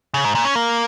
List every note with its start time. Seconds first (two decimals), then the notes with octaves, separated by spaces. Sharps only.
0.14 C#3
0.24 G#2
0.35 A#2
0.45 C#4
0.55 A#3